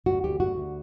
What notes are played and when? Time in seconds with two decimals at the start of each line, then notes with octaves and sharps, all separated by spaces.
0.06 D2 F#4
0.24 D2 G4
0.40 D2 F#4
0.56 D2